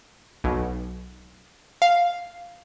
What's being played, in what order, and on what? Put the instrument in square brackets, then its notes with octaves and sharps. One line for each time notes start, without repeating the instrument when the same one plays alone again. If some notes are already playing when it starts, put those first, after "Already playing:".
[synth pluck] B1
F5